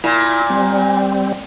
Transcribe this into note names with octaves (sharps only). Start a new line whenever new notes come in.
A#2 E4
G3 C4